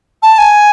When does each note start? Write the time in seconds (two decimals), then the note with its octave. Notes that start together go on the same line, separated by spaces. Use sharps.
0.23 A5
0.38 G#5